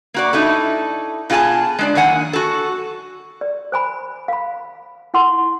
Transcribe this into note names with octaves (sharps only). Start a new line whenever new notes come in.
A#3 F#4 D5
D#4 E4 A4
B2 F4 G#4 G#5 A5
G#3 D4 D5
F#2 D#3 A#3 F#5 G#5
F#4 A4
D5
C5 G#5 B5
F5 B5
E4 F#5 C6